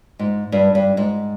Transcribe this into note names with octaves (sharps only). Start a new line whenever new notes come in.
G#2
G2
G2
G#2